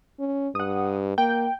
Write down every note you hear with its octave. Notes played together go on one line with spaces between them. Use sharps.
C#4
G2 F#5 D#6
A#3 G5